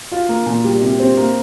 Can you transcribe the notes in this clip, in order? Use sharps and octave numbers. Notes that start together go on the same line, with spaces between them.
F4
A#3
A#2
G3
C3
C4
A#3